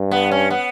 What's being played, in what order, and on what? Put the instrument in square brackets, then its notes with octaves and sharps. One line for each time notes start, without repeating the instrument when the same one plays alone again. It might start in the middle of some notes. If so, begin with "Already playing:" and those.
Already playing: [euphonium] G2
[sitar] B3
C#4
B3